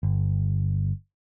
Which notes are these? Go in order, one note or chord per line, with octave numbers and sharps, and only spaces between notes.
G1